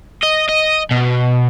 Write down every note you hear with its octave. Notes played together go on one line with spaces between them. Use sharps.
D#5
D#5
B2